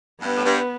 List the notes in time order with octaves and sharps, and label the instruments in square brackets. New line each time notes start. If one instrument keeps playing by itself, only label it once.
[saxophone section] G2 [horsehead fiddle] B3
[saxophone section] A2
G2